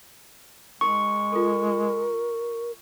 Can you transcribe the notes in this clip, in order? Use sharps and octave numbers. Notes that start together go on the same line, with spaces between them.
G#3 D#4 A#4 C6 C#6
F4 A4 A#4